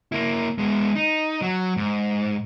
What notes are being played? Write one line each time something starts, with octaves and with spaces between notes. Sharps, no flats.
A#3 E4
G#3 B3
D#4
F#3
G#2